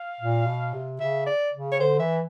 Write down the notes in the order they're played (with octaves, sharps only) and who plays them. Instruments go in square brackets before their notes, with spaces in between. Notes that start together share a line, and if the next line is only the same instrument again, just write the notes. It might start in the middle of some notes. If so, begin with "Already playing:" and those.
Already playing: [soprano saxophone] F5
[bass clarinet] A#2
B2
C3
[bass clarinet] C#3 [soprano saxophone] E5
[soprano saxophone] D5
[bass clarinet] C#3
[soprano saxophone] C#5
[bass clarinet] D3 [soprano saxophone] C5
[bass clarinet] E3 [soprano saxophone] E5